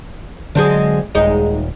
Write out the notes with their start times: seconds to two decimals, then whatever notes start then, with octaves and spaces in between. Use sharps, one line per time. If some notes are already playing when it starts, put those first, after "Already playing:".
0.55 D3 F#3 G#3 C4 D4
1.15 D#1 G#3 D#4